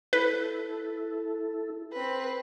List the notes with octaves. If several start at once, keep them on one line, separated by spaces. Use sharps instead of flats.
E4 A4 B4
C4 B4